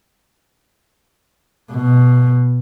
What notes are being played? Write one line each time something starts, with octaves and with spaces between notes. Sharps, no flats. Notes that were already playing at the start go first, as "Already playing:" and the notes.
B2